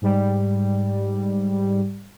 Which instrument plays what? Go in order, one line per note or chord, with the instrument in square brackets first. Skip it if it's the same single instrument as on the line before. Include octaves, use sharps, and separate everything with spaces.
[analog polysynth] G#2 G3